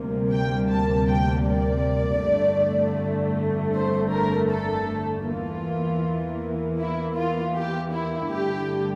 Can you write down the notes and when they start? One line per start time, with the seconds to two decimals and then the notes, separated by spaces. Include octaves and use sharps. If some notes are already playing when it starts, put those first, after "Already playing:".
Already playing: D2 C3 G3 A#3
0.31 G5
0.69 A5
1.08 G5
1.45 D5
2.21 G1 F2 D3 A3
3.74 C5
4.12 A#4
4.50 A4
5.26 E2 E3 A#3 F4
6.78 E4
7.16 F4
7.55 G4
7.92 E4
8.31 G2 D3 A3 G4